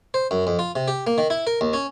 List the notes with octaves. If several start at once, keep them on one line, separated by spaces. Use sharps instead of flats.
C5
F#2
F2
F4
C3
G4
A#3
D#3
E4
A#4
D#2
C#4